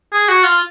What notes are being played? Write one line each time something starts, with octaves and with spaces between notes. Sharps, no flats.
G#4
F#4
F4